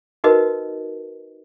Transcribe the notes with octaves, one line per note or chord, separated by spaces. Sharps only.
D#4 F#4 A#4 B4 D#5